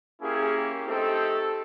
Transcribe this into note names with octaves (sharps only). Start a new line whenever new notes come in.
A#3 C#4 E4 G4 G#4
G4
A3 C4 D#4 G4 A4